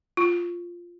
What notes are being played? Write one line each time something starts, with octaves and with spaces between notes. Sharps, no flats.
F4